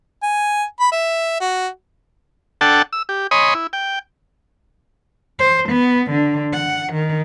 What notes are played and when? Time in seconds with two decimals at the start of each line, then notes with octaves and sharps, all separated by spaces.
0.23 G#5
0.80 B5
0.92 E5
1.40 F#4
2.61 D4 A4 F#5 G5 A5
2.93 E6
3.09 G4
3.31 C#5 D#5 G#5 B5 C6 D#6
3.55 E4
3.73 G5
5.39 C5
5.69 B3
6.11 D3
6.54 F#5
6.93 D#3